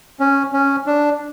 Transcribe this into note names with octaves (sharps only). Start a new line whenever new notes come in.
C#4
C#4
D4